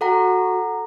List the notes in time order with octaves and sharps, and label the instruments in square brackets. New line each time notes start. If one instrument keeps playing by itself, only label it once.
[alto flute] F#4 [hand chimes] A4 F#5 A#5